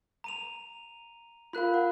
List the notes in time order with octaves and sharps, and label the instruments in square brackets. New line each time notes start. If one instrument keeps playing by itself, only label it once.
[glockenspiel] A#5 D#7 F7
[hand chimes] F4 A#4 F5 [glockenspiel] B5 F#6
[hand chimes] F#5